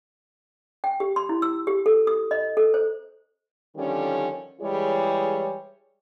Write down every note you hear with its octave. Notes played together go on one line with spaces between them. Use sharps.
G5
G4
C6
E4
E6
G4
A4
D#6
D#5
A4
C5
D3 D#3 F3 G3 C#4
E3 G3 G#3 E4 G#4 C#5